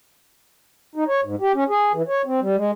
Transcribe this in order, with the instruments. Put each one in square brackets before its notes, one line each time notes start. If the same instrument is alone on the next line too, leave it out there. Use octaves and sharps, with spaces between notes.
[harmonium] D#4
C#5
G#2
G4
C#4
G#4
E3
C#5
C4
G3
G#3